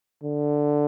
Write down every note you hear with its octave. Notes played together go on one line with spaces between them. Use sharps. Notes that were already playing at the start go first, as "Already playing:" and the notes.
D3